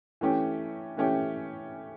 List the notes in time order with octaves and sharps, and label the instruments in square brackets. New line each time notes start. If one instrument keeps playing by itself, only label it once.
[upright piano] E3 A3 C#4 G4
E3 A3 C#4 G4